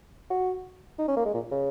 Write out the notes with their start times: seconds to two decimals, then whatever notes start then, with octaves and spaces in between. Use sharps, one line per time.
0.30 F#4
0.99 D#4
1.08 C#4
1.17 A#3
1.25 G#3
1.34 A#2
1.52 C#3